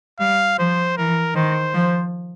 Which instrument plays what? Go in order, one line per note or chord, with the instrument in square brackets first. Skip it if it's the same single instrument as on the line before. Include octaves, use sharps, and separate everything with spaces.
[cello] G3 [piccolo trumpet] F5
[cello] F3 [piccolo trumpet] C5
[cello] E3 [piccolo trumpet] A#4
[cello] D#3 [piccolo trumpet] C5
[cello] F3